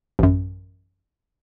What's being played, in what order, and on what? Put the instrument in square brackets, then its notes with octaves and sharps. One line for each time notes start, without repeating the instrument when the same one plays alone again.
[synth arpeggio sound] A1 F#2